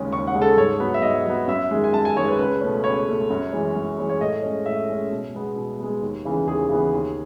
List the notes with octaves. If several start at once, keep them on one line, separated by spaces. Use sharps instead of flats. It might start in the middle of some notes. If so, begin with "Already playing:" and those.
Already playing: D#2 C#3 G#3 C#4
D#2 C#6
F#5
C#3 G#3 C#4
A4
G#2 C#5
F#3 B3
E5
G#2 D#5
F#3 B3
F#2 E5
D#3 G#3
G#5
F#2 A5
G#5
D#3 G#3 C#5
B4
C#2 B4
B2 A3 C#4
C#2 C#5
B2 A3 C#4
F#2
E3 G#3 C#4
F#2
E3 G#3 C#4
C#5
A2 D#5
G#3 C#4
A2 E5
G#3 C#4
B2
G#3 B3
B2
G#3 B3
D#2
C#3 E3 B3
D#2 G#4
C#3 E3 B3
D#2